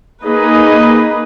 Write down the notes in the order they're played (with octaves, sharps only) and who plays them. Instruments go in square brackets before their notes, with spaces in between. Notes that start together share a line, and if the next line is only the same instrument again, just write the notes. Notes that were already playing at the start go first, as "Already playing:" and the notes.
[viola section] A#3 D#4 G#4 B4 D#5